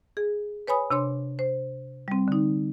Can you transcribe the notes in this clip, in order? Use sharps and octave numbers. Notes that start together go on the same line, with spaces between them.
G#4
B4 C#5 G#5 B5 D#6
C3 D4 C#5 C6
C5
G3 C4
D3 D#4